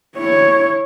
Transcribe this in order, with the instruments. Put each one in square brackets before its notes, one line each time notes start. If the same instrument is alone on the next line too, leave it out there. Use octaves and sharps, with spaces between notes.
[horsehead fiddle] E4 C#5